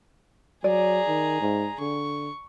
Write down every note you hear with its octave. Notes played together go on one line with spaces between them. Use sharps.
F#3 G#4 D5 A#5
D#3
G#2
D3 C#6